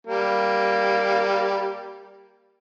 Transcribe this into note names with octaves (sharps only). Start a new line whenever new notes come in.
G3 A#3